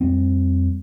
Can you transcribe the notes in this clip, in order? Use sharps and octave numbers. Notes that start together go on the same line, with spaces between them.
F2 G3 C4